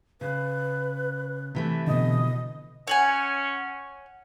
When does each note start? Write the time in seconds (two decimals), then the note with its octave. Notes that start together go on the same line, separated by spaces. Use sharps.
0.21 C#3 B4
1.55 C3 E3 A3
1.87 B2 D3 D#5
2.87 C#4 C#5 F#5 G#5